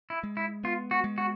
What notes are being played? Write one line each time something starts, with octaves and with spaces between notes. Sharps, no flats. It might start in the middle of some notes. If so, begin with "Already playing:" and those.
E4
G#3
E4
B3 F4
F#4
G#3
F#4